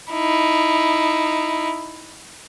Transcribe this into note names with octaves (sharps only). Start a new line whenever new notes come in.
D#4 E4